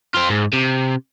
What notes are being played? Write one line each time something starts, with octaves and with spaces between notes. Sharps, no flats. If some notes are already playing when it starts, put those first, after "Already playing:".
C4 F4
G#2
C3